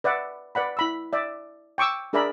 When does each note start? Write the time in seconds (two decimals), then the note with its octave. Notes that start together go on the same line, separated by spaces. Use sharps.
0.04 B4 D5 E5 F#5
0.55 B4 D5 F#5 B5
0.77 E4 B5 E6
1.13 D5 E5
1.78 G5 C#6 D6 E6
2.13 D4 G#4 A#4 D5 E5 B5